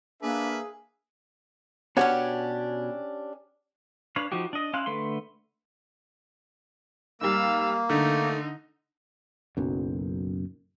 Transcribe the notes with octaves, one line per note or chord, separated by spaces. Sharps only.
A#3 D4 G#4 B4 E5
B2 C#4 D4 G4 C#5 F#5
D4 B4 C#5 F5
F3 D#4 F#4 G4
D4 D#5
C#4 E4 F5 C6 F#6
D3 A3 B4 C6
G#2 G3 A#3 F5 E6
D3 A3 D#4
F#1 B1 F#2